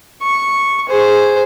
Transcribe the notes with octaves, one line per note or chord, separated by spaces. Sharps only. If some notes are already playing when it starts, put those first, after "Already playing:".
C#6
G#4 C5